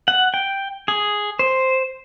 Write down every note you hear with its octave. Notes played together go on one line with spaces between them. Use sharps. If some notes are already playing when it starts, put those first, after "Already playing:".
F#5
G5
G#4
C5